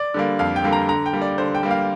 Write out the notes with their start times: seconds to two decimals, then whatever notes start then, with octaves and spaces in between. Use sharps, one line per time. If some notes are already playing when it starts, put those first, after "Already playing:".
Already playing: D5
0.14 D3 G3 A#3
0.39 F2 F5
0.56 G5
0.64 D3 G3 A#3
0.73 A#5
0.89 D3 A#5
1.06 G5
1.13 G3 A#3
1.22 D5
1.38 D3 C5
1.55 G5
1.63 G3 A#3
1.71 F5